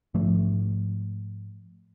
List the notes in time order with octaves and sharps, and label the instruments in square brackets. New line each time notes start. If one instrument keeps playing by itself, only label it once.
[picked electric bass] G#2 F3 A3